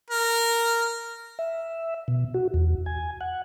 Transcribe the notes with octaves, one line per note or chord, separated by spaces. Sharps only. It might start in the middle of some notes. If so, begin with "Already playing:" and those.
A#4
E5
B2
F#4
E2
G#5
F#5